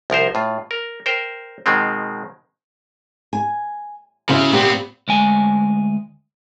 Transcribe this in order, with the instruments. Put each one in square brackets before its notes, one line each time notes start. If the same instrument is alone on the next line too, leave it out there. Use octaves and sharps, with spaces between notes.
[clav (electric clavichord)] C2 F3 A#4 C5
A2 F4
A#4
A#4 C5 G5
B2 D#3 G#3 C4
[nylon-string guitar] G#5
[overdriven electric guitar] C#3 [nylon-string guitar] E4 F#4 C5
[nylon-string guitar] A#2 G4 [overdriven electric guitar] B3 C4
[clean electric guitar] D2 G#3 G#5